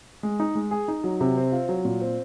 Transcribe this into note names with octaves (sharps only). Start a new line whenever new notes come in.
G#3
D#4
G#3
G#4
D#4
F#3
C3
C4
F4
F#3
A#2
C4